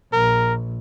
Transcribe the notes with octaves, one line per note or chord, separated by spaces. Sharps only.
A#1 A#4